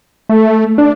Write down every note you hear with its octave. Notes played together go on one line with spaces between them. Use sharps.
A3
D4